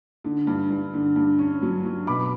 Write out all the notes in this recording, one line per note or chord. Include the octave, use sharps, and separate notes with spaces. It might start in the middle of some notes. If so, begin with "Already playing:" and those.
D3
G2
G2
D3
G2
C#4
F#3
F#3
B2 B5 D6